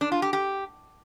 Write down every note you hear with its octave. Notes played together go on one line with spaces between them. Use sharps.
D4
F4
G4
G4